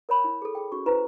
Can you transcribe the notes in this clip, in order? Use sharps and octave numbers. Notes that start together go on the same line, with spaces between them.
A#4 C#5 B5
E4
G#4 A4
G#4 G5
C#4 F#4 C#6
E4 B4 C5 A#5